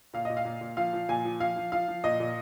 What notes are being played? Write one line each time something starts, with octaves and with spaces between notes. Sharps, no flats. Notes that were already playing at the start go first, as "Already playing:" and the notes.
A#2 F5
A#2 D#5
F5
A#2
A#2
F3 F5
F3
A#2 G#5
F3
F3 F5
F3
F3 F5
F3
A#2 D#5
A#2